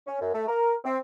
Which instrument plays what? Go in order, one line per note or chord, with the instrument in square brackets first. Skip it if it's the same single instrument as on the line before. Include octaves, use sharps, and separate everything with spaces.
[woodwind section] C#4
F#2
A3
A#4
C4